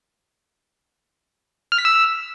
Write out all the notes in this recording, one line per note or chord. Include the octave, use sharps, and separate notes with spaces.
F6
B6
E6